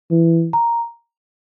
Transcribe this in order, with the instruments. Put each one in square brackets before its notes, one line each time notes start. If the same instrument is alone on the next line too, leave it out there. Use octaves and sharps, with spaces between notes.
[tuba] E3
[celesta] A#5